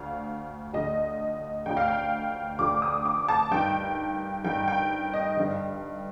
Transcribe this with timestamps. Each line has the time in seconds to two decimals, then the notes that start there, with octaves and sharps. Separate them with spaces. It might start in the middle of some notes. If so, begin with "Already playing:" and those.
Already playing: D2 D3 F5
0.73 D2 D3 D#5
1.66 D2 D3 G5
1.77 F5
1.88 G5
2.59 D2 D3 D6
2.82 D#6
3.05 D6
3.28 A5
3.51 G2 D#3 G5
4.44 G2 D#3 G5
4.68 G5
5.13 D#5
5.37 G2 D3